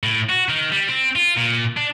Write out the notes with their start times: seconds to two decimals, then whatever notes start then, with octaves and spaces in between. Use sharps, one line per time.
0.03 A2
0.30 F#4
0.49 D#3
0.73 G3
0.89 C4
1.16 F4
1.36 A#2
1.77 D4